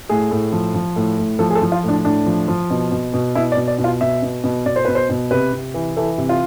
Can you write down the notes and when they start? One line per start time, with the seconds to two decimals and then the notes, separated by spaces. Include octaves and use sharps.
0.09 A2 G#4
0.31 A2
0.52 F3
0.74 F3
0.96 A2
1.18 A2
1.39 F3 A4
1.50 G#4
1.55 A4
1.62 F3
1.72 F4
1.84 A2 D4
2.04 A2 D4
2.26 F3
2.48 F3
2.70 B2
2.92 B2
3.14 B2
3.35 B2 E4
3.52 D5
3.57 B2
3.68 D5
3.79 B2
3.84 F4
4.01 B2 E5
4.22 B2
4.44 B2
4.66 B2 D5
4.76 C5
4.85 B2 B4
4.95 C5
5.10 B2
5.31 C3 B4
5.53 C3
5.74 E3
5.97 E3 A4
6.18 C3
6.29 F4